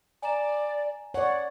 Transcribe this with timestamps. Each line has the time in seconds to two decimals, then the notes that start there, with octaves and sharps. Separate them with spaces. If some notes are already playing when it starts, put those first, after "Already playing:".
0.22 D5 G#5 A#5 E7
1.14 C#5 D5 F#5